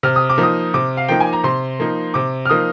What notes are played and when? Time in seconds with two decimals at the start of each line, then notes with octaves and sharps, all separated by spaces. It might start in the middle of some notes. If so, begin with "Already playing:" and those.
0.03 C3 F6
0.16 D#6
0.30 D6
0.38 F3 A#3 D#4
0.43 D#6
0.74 C3 D6
0.97 F5
1.08 F3 A#3 D#4 G5
1.20 G#5
1.33 A#5
1.44 C3 C6
1.80 F3 A#3 D#4
2.14 C3 D6
2.46 F6
2.49 F3 A#3 D#4 D#6